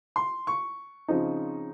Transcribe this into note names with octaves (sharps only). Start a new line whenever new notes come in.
C6
C#6
C#3 F3 C4 D#4